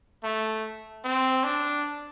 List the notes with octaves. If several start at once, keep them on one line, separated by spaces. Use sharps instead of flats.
A3
C4
D4